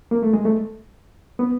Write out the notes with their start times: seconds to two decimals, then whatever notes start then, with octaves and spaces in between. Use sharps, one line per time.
0.11 A#3
0.23 A3
0.33 G#3
0.45 A3
1.39 B3